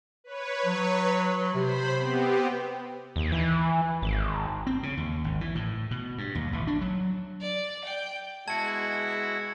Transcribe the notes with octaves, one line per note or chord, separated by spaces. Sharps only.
B4 C#5
F#3
C3 C5 B5
B3 C4 G4
D#2
E3
G#1
C4
C#3
D#2
G#1
E3
A2
B2
G2
D#2
A1
D4
F#3
D5
G5
B2 G#3 E4 F#4 A5 G#6 C#7